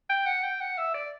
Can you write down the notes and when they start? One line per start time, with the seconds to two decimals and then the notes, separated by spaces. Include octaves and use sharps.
0.10 G5
0.26 F#5
0.43 G5
0.61 F#5
0.78 E5
0.94 D5